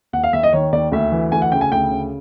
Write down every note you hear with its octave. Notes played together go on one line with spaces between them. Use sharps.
D#2 F#5
F5
D#2 E5
D#5
D#3 C#5
D#2 D5
D2 E5
E3
D2 G#5
F#5
C#3 G5
G#5
D2 G5
C#3